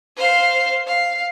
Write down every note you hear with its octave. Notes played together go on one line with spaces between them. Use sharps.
C5 F5
F5